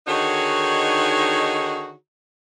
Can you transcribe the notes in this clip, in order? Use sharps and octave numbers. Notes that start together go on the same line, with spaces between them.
D3 D#3 D#4 F#4 G#4 C#5